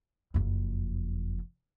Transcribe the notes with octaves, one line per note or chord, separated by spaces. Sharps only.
F#1 F2